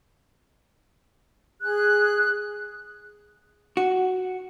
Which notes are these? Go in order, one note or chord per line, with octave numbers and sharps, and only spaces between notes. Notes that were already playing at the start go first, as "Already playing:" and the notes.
G#4 F#6
F#4